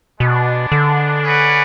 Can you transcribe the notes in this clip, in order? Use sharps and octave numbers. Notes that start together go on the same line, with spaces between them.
B2 G#3 B3 D4
D3
C#4 G#4 B4 D5 F#5